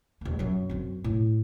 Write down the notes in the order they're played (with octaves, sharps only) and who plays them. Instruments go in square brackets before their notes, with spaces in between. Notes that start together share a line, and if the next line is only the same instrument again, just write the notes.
[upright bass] D#1 A#3
F#2 F#3
F#2 C4
A2